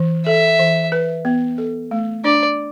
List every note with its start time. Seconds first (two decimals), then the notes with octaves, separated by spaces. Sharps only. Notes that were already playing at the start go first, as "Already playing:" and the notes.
Already playing: E3
0.26 A4 E5
0.59 E3
0.92 B4
1.25 B3
1.58 A4
1.91 A3
2.24 D4 D5